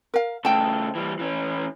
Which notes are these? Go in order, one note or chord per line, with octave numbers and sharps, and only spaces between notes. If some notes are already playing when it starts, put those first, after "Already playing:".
A#4 F5
C#3 A3 G5 A5
E3 G3
E3 C#4